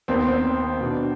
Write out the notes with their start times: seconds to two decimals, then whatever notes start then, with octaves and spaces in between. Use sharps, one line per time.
0.08 D#2 D#3 B3 C4
0.27 C4
0.81 B2 B3 D4